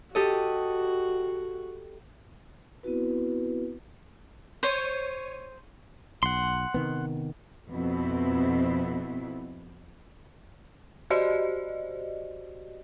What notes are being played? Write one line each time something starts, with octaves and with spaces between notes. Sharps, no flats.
F#4 G4 A4 D#5
B3 C4 E4 F#4 B4
C5 C#5 D#7
B1 F#5 C6
C3 D#3 B3
F2 B2 B3 C4 E4
F#4 G4 C5 D5 D#5